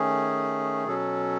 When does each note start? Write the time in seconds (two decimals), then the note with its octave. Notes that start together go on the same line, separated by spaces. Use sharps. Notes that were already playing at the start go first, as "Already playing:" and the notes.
Already playing: D#3 A3 C#4 G#4
0.87 B2 F#3 C#4 A4